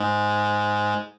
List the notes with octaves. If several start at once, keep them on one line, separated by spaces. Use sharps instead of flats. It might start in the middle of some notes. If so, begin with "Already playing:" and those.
Already playing: G#2 G#3